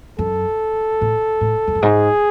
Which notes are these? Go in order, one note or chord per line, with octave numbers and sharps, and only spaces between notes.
F#2 A4
A2
A2
F2
F#2
G#2 G#4